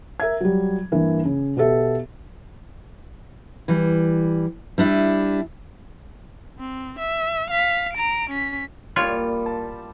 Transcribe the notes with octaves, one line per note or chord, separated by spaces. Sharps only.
A#4 E5 G#6
F#3 G3
G2 E3 A#3
C#3
B2 B3 G4 A4 E5
E3 G3
G3 D4 E4
C4
E5
F5 B6
A#5 D7
C#4 B6
A#2 G3 F4 C#5
A5